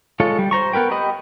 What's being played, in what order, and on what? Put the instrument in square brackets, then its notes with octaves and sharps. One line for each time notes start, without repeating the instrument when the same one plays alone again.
[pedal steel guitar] G#3 F4 A4 C#5
G3
C5 A#5 C#6
B3 A#4 B4 G5
G4 D#5 B5